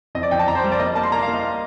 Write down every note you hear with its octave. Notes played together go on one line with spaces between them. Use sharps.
F2 D#5
D5
F2 G5
A5
F2 A#5
C5
G3
D5
A#3 D#5
A#3 A5
C6
A#3 A#5
F5
A#3
D#5